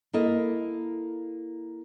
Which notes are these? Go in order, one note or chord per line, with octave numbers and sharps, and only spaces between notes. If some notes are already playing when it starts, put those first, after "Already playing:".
A#3 E4 A4 D#5